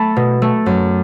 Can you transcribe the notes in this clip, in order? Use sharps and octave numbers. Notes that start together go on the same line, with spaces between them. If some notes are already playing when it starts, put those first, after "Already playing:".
Already playing: A3 A5 B5
B2
A3
F#2